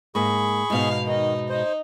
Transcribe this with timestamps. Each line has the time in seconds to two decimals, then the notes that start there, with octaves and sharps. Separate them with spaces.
0.15 G#2 A#3 G#4 B5 C#6
0.70 G#2 B2 D#4 F5
1.06 D#3 D#4 D#5
1.49 D#4 C5 D#5